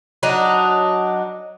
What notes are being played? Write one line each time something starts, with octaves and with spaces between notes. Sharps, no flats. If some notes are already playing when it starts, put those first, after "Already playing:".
F#3 D4 D#4